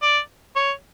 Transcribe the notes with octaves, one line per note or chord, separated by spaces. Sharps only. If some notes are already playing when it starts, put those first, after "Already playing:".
D5
C#5